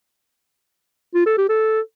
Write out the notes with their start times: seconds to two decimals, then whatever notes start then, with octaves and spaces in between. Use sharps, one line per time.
1.15 F4
1.26 A4
1.38 G4
1.49 A4